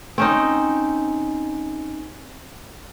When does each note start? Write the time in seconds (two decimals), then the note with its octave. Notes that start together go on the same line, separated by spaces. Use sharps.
0.18 C4 C#4 D#4